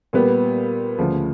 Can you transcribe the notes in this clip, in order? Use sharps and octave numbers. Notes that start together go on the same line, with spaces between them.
A#2 G3 B3
D2 C#3 F3